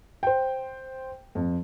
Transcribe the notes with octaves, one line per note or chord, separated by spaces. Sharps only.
C5 G5
F2